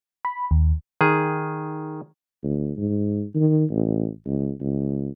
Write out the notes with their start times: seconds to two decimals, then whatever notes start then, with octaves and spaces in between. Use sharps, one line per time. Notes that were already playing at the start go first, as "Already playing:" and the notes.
0.25 B5
0.51 D#2
1.01 D#3 G#4
2.43 D2
2.77 G#2
3.35 D#3
3.70 A1
4.26 C#2
4.60 C#2